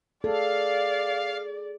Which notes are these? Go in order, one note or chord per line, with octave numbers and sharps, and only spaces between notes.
G#4 A4 D5 F5